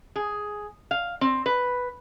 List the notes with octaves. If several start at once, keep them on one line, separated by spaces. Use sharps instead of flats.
G#4
F5
C4
B4